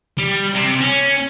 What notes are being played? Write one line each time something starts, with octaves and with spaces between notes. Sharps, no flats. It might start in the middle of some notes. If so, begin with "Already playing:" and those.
G3
C3
C#4